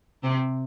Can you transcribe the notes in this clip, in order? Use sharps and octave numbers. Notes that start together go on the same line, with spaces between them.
C3 C4